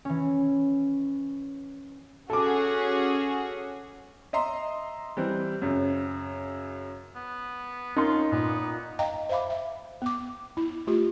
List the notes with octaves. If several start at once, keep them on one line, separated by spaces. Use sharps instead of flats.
E3 C#4
C#4 F#4 G#4 A4 D6
D#5 E5 A#5 C6
E3 G3 C4
F#2 C#3
B3
C#4 D#4 F4 A#4 C6
A#2 B3
D#5 F5 G5 A#5
C5 E5 F5 B5 D6
E5
B3 D6
E4
A3 F4 G4